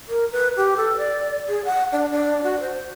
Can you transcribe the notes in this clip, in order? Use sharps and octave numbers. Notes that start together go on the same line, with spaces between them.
A#4
B4
G4
A4
D5
G#4
F#5
D4
D4
F#4
C5